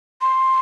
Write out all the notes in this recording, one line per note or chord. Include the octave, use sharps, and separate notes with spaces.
C6